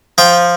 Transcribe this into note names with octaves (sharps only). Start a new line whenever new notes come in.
F3 G5